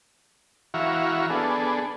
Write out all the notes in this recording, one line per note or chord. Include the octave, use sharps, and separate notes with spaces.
E3 E4 F#4 F5 A#5 C#6
B3 D4 G#4 A4